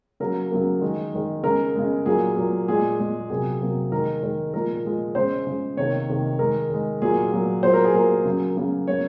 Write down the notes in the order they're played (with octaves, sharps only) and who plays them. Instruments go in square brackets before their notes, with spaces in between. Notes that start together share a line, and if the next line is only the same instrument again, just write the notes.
[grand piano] C#3 F#3 A#3 A#4
C#3 F#3 A#3
D#3 G#3
D#3 G#3
C#3 G#3 A#4
C#3 G#3
A#2 F#3 A#3 G#4
A#2 F#3 A#3
A#2 G#3 G#4
A#2 G#3
C3 F#3 A#3 G#4
C3 F#3 A#3
D#3 G#3 A#4
D#3 G#3
A#2 F3 G#3 A#4
A#2 F3 G#3
C#3 G#3 C5
C#3 G#3
C3 D#3 A#3 C#5
C3 D#3 A#3
D#3 G#3 A#4
D#3 G#3
A#2 F#3 A#3 G#4
A#2 F#3 A#3
A#2 F#3 A#3 C5
A#4
G#4
A#2 F#3 A#3 A#4
C#3 F#3 A#3
C#3 F#3 A#3
C#3 F#3 A#3 C#5